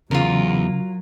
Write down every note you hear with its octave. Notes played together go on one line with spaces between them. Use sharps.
E2 C#3 F#3 F4 A#4